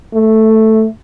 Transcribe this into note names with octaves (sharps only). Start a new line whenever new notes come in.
A3